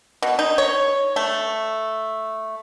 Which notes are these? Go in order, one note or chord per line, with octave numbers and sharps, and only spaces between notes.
B2
D#4
C#5
A3